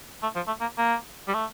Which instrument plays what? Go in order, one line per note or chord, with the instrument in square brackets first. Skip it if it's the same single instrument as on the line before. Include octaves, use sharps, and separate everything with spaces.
[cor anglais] A3
F3
A3
A#3
A#3
G3
A3